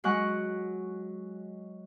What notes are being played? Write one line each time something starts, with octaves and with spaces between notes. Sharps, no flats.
F#3 G#3 F#5 C#6 F#6